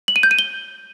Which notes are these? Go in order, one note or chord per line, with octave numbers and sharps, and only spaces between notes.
F#7
D#7
G6
D#7
G7